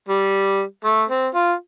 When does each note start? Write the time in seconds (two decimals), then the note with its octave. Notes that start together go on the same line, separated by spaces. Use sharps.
0.09 G3
0.85 A3
1.10 C4
1.35 F4